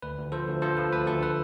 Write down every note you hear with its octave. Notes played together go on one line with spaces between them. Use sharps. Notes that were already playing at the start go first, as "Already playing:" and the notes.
D2 B4
D2
F3 A4 C5
D2
F3 A4 C5
F3 B4
D2 B4
D2 A4
B4